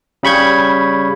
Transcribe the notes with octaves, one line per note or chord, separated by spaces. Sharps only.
C#3 G3 B5 C#6 G6 G#6